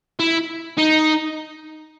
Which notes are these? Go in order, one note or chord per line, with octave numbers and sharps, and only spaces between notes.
E4
D#4